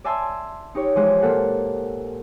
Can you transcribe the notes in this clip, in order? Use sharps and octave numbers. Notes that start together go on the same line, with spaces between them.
D5 E5 G#5 A5 C6 E6
D#4 G4 C#5
E3 F3 G#3 G4
A#2 A#3 A4 F#5